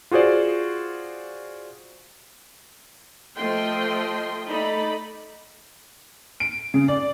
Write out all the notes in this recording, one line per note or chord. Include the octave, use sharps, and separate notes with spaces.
F4 F#4 G#4 C5 D5
F3 A3 D#5 G5 C6
A3 D#4 D5 B5
D7
C#3
D5